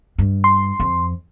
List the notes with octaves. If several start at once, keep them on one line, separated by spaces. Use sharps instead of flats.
G2
C6
F2